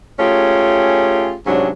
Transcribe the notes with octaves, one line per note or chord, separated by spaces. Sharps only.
A3 C#4 F4 G4 G#4
G#2 C3 F#3 C#4 D4